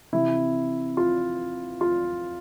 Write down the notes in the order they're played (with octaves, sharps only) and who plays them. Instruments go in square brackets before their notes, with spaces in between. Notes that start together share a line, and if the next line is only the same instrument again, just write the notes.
[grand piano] C3 E3 E4
F4
F4